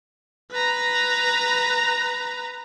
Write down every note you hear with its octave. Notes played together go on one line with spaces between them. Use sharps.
B4 A#5